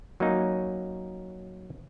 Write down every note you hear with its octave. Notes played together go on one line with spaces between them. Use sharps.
F#3 A#3 C#4 D#4